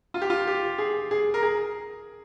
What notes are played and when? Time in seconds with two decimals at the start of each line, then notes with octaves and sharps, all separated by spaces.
0.14 F4
0.22 G4
0.30 F4
0.47 G4
0.78 G#4
1.11 G#4
1.34 A#4
1.43 G#4